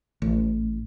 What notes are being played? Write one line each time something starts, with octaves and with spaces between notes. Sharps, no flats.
A1